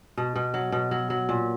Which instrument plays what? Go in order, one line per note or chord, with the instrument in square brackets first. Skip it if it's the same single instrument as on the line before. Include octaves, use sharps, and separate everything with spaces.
[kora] B2
B2
F#3
B2
F#3
F#3
A#2